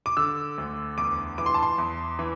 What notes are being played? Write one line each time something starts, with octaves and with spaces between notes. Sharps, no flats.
D6
D3 E6
D2
E2 D6
E3 D6
C6
A5
C6
E2
E3